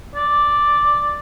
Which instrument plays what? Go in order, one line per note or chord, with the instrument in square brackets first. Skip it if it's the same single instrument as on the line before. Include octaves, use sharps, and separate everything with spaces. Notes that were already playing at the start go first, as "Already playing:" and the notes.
[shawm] D5